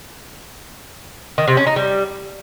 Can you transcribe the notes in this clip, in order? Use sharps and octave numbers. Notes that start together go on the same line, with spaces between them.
D#3
C3
C#4
D#4
G3